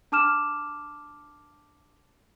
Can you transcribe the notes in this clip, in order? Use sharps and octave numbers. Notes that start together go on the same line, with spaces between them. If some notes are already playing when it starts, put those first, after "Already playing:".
D4 A5 D6 F6 E7